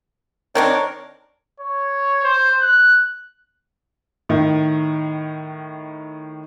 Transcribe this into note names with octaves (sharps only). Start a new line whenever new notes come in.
D#3 C4 D4 A#4 C#5
C#5
C5
F#6
A2 D#3